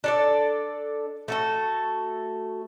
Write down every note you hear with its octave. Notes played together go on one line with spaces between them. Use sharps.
D4 A4 D5
A3 F#4 A4